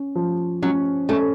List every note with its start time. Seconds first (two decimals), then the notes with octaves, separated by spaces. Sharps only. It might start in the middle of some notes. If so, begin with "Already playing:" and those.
Already playing: C#4
0.15 F3
0.63 F#3 C#4
1.09 A3 C#4